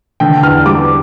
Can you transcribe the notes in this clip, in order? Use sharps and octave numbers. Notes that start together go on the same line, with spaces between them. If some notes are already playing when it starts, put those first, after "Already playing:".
D3 G5
E2 F6
G3 D6